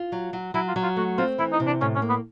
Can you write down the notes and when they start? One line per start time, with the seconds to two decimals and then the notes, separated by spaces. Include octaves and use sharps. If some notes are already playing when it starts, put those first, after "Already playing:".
Already playing: F4
0.12 F#3
0.33 F#3
0.54 F#3 E4
0.68 F4
0.76 F#3
0.83 F4
0.97 A3 F#4
1.18 C4 F4
1.39 E3 E4
1.53 D#4
1.60 C3
1.67 D4
1.81 A2 C#4
1.95 C#4
2.02 A#3
2.09 B3